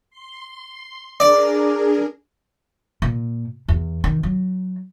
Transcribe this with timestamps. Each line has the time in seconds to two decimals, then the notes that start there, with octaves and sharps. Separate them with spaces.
0.10 C6
1.20 D4 G#4 A#4 D5
3.02 A#2
3.68 E2
4.04 D#3
4.23 F#3